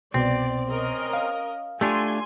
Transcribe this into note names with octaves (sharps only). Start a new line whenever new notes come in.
C2 B2 C4 D5
C#4 A#4 D#5
F5
A3 D4 F4 G4 G#5 C6